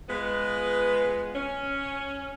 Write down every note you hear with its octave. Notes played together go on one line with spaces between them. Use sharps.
G#3 B3 F4 B4
C#4